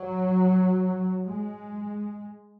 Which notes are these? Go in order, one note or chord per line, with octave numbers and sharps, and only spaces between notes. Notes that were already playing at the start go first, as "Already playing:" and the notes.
Already playing: F#3
G#3